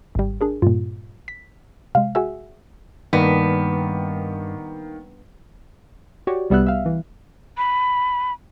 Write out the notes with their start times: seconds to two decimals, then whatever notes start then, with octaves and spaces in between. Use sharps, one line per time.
0.15 G#1 G3
0.41 D4 G#4 A#4
0.62 G2 A#2 F4
1.28 B6
1.95 C3 G#3 F5
2.15 F#4 G#4 E5
3.13 G2 D#3 A#3 B3
6.27 F#4 G4 C#5 D5
6.50 C2 G3 B3 E5 F#6
6.67 E5 F5
6.86 E3
7.57 B5